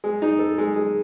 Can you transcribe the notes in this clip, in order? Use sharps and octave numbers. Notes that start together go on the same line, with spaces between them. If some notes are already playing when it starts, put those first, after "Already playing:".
G#3
D#4
A4
G#3
G#3